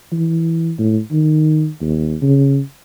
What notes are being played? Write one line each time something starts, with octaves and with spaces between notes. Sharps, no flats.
E3
A2
D#3
D#2
C#3